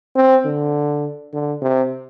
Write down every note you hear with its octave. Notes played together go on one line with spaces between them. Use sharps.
C4
D3
D3
C3